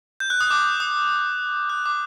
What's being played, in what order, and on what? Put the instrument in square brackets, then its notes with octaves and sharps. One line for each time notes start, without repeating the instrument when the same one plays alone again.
[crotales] G6
F#6
D#6
D6
D#6
F#6
D6